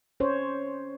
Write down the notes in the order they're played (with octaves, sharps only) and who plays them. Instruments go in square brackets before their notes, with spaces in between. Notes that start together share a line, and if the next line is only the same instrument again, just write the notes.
[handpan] C#4 C5 C#5